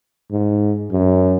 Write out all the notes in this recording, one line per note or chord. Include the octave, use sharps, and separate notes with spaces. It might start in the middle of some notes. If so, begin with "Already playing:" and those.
G#2
F#2